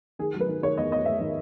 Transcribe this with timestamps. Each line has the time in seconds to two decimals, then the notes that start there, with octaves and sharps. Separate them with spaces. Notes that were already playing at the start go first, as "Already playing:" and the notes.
0.19 D#3 G#4
0.34 F#3
0.40 B4
0.48 D#3
0.62 D#3 C#5
0.78 E2 D#5
0.91 B3 D#5
1.06 B3 E5
1.20 D#3